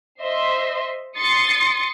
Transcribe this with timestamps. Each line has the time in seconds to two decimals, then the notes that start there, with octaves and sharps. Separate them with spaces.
0.20 C5 D#5 E5 C6
1.16 C6 D#6 A6 C7 C#7